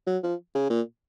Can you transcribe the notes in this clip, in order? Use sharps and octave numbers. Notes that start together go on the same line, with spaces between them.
F#3
F3
C#3
A#2